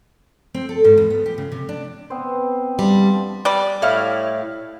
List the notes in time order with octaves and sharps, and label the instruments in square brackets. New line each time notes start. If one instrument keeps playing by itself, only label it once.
[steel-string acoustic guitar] C4
A4
G#2
E2
B3
G4
C#3
C3
D4
[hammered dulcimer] B3 C4 C5
[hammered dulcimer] F3 D4 F4 [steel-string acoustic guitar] G3
[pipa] G3 D5
[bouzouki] A2 E4 F5